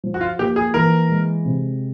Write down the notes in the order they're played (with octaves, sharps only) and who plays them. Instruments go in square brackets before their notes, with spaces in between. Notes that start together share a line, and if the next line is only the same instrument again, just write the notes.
[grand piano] F3
[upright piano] F#4
F4
[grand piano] A#3 [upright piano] G4
[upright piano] G#4
[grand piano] E3 [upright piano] A#4
[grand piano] G#3
C3